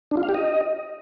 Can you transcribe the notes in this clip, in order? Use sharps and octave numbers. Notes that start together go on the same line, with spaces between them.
D4
F4
F5
G4
D#5